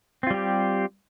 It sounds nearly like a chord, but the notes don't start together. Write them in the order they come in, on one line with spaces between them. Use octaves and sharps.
C4 F4 G3 G4